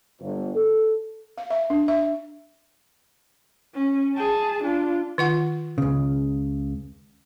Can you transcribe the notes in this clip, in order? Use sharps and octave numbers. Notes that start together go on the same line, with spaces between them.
G1
A4
F5
E5
D4
E5
C#4
G#4 A5
D4 F4
D#3 F4 F#5
C#2 C#3